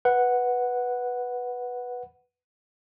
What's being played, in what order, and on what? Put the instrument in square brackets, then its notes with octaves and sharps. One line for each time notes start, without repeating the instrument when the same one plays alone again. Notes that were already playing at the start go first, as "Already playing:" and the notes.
[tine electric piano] B4 F#5